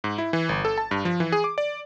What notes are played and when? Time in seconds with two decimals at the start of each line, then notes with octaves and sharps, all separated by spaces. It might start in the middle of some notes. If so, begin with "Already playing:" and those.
0.04 G#2
0.18 E4
0.33 E3
0.49 G1
0.65 A4
0.78 A5
0.91 G2
1.05 F3
1.20 E3
1.32 G#4
1.44 D6
1.58 D5